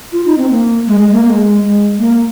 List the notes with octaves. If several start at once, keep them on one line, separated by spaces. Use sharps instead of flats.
F4
D#4
C4
A#3
G#3
G#3
A#3
A#3
G#3
G#3
A#3